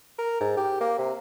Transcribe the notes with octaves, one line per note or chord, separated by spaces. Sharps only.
A#4
G#2
G4
A#3
C3